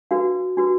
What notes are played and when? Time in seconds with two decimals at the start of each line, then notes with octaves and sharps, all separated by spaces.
0.11 D4 F#4 B4 F5
0.57 D4 F#4 B4